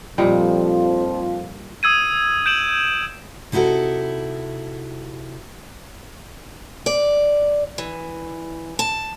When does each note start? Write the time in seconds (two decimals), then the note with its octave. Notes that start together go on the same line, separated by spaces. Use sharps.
0.18 F2 A#2 F3 G3 D#4
1.83 D#6 E6 G#6 D#7
2.46 G6 D7 E7 F#7
3.52 C3 D#4 E4 F#4 A4
6.86 D5
7.78 E3
8.79 A5